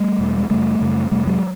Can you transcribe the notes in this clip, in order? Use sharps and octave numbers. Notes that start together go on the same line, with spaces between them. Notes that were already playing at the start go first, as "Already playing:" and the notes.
Already playing: G3 A3
E2 B2
G#3
F#2 C#3 G3 A3
F#2 C#3
F2 C3 G3 A3
F#3 G#3